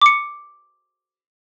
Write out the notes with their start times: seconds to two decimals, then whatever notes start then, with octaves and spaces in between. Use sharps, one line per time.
0.02 D6 C#7